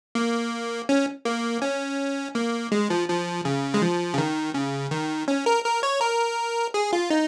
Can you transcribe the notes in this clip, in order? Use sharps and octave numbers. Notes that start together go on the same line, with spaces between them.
A#3
C#4
A#3
C#4
A#3
G#3
F3
F3
C#3
G#3
F3
C#3
D#3
C#3
D#3
C#4
A#4
A#4
C#5
A#4
G#4
F4
D#4